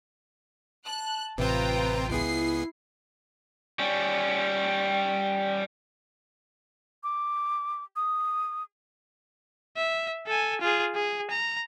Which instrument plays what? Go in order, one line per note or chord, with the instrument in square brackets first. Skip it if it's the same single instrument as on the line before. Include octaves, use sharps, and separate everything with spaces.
[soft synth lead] A5 [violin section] F#6
[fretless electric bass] A1 [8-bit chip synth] C3 C4 [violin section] F4 G5 A#5 [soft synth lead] B4
[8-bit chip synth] C#2 B3 G#4 [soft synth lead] E4 [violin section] C7
[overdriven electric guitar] G3 C#4
[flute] D6
D#6
[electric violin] E5
A4 G#5
F4 G#4
G#4
A#5